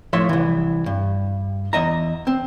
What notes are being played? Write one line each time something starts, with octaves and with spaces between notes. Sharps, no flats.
A2 F3 C#5 E5 C6
C2 E3
G2
E2 D#5 E5 A#5
C4